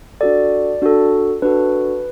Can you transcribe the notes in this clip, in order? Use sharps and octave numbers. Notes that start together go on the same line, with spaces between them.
D4 F#4 A4 D5
D4 F#4 A4
D4 F#4 A4 B4